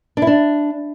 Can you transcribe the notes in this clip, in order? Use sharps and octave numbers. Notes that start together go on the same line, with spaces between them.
D4
E4
D4